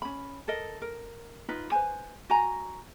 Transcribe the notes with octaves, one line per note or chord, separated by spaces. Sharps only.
C#4 B5
A4 A#4 D#5
A#4
D#4 F4 B4 B5
B4 C5 G#5
F#4 G#5 A#5